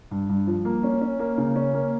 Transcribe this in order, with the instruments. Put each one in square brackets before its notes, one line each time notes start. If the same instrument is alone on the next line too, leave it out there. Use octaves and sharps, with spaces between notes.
[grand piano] G2
G2
F3
A#3
C#4
C#4
A#3
C#3
C#4
A#3